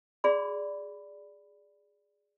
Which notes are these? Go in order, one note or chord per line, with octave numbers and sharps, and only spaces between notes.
F#4 G#4 D5 B5